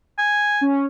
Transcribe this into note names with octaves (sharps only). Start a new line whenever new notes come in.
G#5
C#4